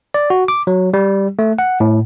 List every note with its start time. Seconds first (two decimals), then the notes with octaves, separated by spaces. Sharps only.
0.14 D5
0.30 F#4
0.48 D6
0.67 F#3
0.94 G3
1.39 A3
1.59 F#5
1.80 A2